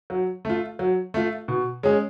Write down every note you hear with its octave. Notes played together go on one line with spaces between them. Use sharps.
F#3
A3 F4
F#3
A3 F4
B2
G#3 C#4 G#4